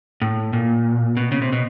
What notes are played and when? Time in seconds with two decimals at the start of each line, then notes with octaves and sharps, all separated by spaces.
0.22 A2
0.53 A#2
1.17 B2
1.32 C#3
1.42 C3
1.52 B2